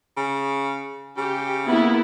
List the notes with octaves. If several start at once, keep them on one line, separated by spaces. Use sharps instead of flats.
C#3
C#3 G4
A#3 B3 E4